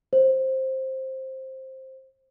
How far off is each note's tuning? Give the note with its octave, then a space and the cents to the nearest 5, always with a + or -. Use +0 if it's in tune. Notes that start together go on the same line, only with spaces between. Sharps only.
C5 +10